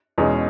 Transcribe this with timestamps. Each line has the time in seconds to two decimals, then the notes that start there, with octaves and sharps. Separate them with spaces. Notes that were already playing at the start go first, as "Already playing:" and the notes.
0.18 E2 B2 G#3 C#4